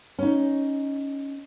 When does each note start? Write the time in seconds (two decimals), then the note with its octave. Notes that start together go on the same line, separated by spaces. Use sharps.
0.19 C#4 D#4